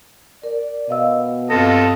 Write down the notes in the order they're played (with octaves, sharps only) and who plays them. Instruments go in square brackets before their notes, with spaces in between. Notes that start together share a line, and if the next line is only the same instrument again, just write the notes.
[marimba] A#4 [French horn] D5
[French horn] B2 [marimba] D#5 F5 E6
[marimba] G2 C4 A#6 [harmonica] F4 A4 D#5